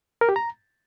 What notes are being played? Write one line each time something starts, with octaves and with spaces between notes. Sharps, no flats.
A#4
G4
A#5